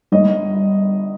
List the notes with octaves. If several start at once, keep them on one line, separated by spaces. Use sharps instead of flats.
G1 D#5